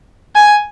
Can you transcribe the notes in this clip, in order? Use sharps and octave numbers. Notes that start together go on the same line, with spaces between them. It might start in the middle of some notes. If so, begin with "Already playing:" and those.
G#5